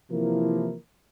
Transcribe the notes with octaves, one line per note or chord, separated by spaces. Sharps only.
C3 E3 F3 A#3 E4 A#4